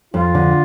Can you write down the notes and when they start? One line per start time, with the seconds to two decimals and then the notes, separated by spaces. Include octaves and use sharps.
0.14 F2 F4
0.35 D3